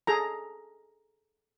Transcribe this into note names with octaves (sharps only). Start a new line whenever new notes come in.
G#4 A4 A#5